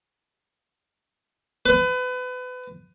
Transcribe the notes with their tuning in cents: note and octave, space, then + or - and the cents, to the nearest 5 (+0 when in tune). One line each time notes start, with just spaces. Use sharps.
B4 +30